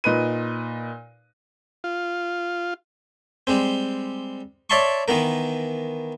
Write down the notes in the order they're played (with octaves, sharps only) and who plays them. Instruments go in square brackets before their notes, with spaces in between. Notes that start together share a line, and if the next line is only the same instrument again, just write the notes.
[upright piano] A#2 D#4 B4 D#7
[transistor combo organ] F4
[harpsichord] G3 G#3 C4
C#5 D5 E5 A5 C6 C#6
D#3 E3 B3 A#4